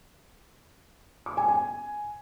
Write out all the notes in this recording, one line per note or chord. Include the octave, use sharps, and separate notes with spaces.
D6
G#5
G#5